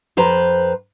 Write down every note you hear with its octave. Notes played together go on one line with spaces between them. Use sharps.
F2 B4 C5 A#5